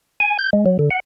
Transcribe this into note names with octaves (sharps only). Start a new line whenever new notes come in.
G#5
G6
G#3
F#3
D3
F#5